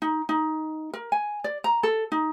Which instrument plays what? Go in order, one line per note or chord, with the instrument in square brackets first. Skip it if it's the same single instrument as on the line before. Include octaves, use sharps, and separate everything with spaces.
[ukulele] D#4
D#4
A#4
G#5
D5
A#5
A4
D#4